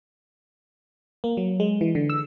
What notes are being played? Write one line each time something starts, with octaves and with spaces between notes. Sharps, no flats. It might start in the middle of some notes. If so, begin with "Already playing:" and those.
A#3
F#3
G#3
E3
D3
E6